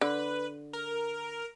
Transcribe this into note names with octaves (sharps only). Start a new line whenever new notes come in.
D3 B4
A#4